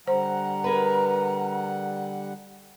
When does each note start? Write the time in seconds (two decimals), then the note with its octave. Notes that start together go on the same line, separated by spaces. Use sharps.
0.07 D3 G3 C5 F#5 A#5
0.64 G#4 A#4 B4